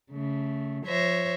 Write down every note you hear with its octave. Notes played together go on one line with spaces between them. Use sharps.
C#3 A3
F3 C5 C#5 E5 A#6